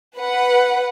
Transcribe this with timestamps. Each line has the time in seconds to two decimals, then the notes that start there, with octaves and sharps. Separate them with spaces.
0.16 B4 F#5